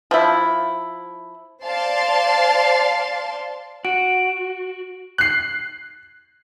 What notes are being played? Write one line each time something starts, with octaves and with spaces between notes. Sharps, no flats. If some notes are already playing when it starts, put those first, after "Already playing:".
F3 E4
C5 D5 F5 A5 C6
F#4 D7
F#6 C7